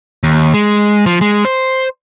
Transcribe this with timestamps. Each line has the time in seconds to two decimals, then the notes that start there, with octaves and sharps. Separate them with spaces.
0.23 D#2
0.54 G#3
1.06 F3
1.21 G#3
1.45 C5